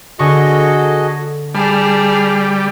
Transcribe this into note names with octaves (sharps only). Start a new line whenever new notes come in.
D3 F#4 G#4 A4 D#5 C#6
G3 G#4 A5 B5 F6